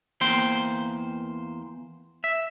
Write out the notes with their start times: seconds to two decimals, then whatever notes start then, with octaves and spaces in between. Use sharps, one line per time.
0.21 E2 A#3 C5 G5 C6
2.24 E5